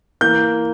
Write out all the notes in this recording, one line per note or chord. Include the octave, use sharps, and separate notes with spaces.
E3 A#3 G6